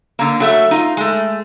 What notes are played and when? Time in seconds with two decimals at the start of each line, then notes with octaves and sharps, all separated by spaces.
0.19 D3 A#3
0.40 F#3 A3 E5
0.71 D#4 F4
0.97 G#3 A3